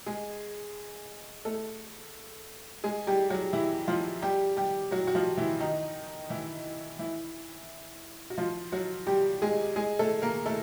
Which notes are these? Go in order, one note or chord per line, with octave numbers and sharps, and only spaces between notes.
G#3 G#4
A3 A4
G#3 G#4
G3 G4
F#3 F#4
E3 E4
F3 F4
G3 G4
G3 G4
F#3 F#4
F#4
F3 F4
E3 E4
D#3 D#4
E3 E4
E3 E4
F#4
F3 F4
F#3 F#4
G3 G4
G#3 G#4
G#3 G#4
A3 A4
A#3 A#4
A3 A4